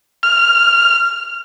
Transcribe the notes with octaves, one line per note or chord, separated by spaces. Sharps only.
F6